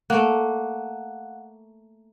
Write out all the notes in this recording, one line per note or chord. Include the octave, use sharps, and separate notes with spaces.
A3 A#3 F5 F#5 F#6